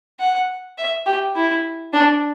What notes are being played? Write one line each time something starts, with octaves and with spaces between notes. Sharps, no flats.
F#5
E5
G4
E4
D4